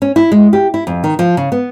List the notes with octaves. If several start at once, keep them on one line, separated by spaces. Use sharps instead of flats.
C#4
E4
G#3
G4
E4
F2
D#3
F3
C#3
B3